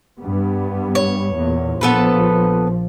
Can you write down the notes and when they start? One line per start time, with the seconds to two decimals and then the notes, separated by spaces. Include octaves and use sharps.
0.19 G2 G3 B3
0.95 C#5
1.35 E2 A#2
1.81 A#1 F3 B3 A4 B4